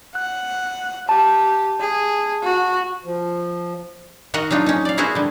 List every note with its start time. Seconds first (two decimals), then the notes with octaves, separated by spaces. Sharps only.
0.15 F#5 F#6
1.09 G4 A5
1.80 G#4
2.43 F#4
3.05 F3
4.34 D#3 F#4 A#4 D#5 F#5
4.51 F#3 D4 D#4 F4
4.66 C#4 D#4
4.85 D5 F5
4.97 B3 E4 F#4 G#4 A#4 C5
5.15 D3 G3